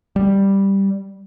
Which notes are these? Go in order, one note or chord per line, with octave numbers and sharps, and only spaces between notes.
G3